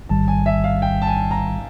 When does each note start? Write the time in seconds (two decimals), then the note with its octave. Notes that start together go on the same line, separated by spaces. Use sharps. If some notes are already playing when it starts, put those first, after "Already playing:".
0.09 A1 G#2 D#3 G3 A5
0.28 G#5
0.46 E5
0.64 F5
0.82 G5
1.02 A5
1.07 G#5
1.31 A#5